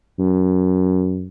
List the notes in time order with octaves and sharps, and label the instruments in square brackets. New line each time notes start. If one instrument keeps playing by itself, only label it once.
[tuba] F#2